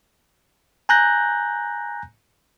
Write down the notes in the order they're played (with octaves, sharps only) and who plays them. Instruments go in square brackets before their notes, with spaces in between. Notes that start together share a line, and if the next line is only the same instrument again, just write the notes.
[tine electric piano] G#5 A#5 F#6 G6 A#6